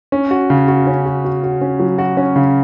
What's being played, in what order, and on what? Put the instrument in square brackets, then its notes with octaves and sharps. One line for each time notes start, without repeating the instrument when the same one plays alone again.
[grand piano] C#4
F#4
C#3
F#4
C#4
F#4
F#4
F#4
C#4
F#3
F#4
C#4
C#3